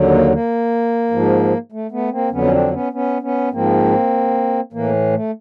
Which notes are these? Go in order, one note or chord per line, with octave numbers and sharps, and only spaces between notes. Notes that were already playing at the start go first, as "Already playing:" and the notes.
Already playing: D#2 D3 F#3
A#3
A#3
G#2 F3
A3
A3 B3
A#3 C4
F2 D3 F#3 B3 C#4
C#4
C4 D4
B3 C#4
B3 C#4
B3 C#4
G#2 F3 A#3 C4
A2 E3 A#3
A3